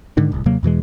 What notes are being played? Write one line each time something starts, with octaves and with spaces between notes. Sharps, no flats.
G#2 D3 D#3
D1 C2
D#2 C3 F#3 A#3
E2 B2 E3 G#3